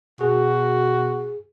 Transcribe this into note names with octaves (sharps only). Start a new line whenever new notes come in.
B2 F#4 G#4